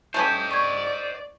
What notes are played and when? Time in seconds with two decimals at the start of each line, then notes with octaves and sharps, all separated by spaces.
0.14 A3 C#4 G4 C5 D#5
0.51 D5 C#6 G#6